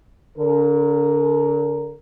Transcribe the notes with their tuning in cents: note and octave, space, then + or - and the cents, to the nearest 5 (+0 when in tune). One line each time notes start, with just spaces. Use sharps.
D3 -40 A#4 -5